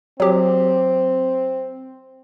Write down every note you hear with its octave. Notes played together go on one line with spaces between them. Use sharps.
F#3 C4 G4